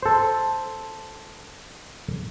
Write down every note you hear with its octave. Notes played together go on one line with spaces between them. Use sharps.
A4 C5